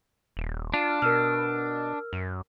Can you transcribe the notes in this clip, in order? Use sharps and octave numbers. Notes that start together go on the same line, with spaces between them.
D#1
D4 F4
B2 A#4 E6 F6
F#2